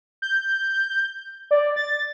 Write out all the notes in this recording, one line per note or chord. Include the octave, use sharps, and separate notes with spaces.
G6
D5
A6